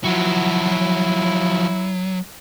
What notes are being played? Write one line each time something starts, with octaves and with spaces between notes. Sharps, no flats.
F3 F#3 E4 F#4